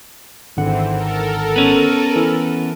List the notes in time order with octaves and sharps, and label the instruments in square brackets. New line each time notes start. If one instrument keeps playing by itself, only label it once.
[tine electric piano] G#1 D3 F#5 [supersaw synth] E3 C4
[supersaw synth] A4 A#4
[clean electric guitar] B3 C#4
[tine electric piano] E3